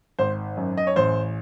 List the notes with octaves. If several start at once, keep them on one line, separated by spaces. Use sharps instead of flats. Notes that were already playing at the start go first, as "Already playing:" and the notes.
G#1 C5
F#2
D#5
C#5
A1 C5